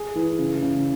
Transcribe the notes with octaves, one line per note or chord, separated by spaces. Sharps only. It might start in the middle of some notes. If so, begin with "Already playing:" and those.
Already playing: G#4
E3
C#3
C#3